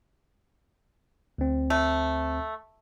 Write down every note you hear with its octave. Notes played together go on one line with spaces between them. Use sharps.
D2 C4
A3